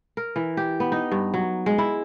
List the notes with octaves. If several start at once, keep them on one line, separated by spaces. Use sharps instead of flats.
A#4
E3
G4
B3
D#4
G2
F#3
G#3
E4